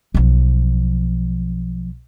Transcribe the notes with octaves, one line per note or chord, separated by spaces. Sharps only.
B1 F3